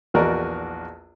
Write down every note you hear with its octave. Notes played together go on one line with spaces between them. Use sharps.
A#1 E2 F#4 A#4 D5 D#5